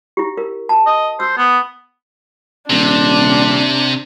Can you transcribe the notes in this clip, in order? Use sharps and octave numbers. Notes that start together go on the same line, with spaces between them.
E4 G4
A#4
A5
D#5
C5 E6
B3
D#1 C3 D4